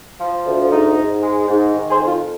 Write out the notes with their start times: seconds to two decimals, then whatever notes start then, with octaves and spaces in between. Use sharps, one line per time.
0.20 F3
0.45 D2
0.71 G#2 D#4
0.97 G#2
1.22 G#3
1.48 G#2
1.73 D#3
1.90 G#4 C5
1.99 F2
2.07 F4